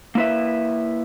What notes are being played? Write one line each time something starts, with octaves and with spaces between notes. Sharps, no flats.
A#3 E4 B4 E5